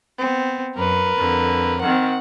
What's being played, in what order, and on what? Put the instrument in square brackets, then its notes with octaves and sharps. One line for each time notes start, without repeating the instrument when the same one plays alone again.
[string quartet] B3 C4
[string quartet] F#2 [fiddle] A#4 B4
[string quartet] F2 D3
[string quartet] D#3 C4 [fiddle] F#5